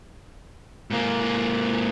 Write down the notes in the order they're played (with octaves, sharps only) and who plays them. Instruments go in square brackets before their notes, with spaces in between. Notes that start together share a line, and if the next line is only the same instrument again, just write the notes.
[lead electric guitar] G#2 A#3